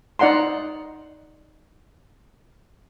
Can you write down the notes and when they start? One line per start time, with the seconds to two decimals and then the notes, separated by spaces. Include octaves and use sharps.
0.19 D#4 D5 F#5 A#5 C6